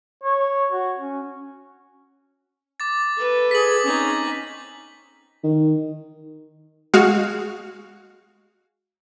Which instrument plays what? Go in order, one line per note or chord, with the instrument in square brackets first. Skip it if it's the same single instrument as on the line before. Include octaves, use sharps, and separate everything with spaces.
[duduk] C#5
F#4
C#4
[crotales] D6 A6
[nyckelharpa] A4 B4
[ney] G#4 [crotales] B6 F#7
[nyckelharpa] C4 D#4 [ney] C#4
[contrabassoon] D#3
[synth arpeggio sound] G#3 F#4 F5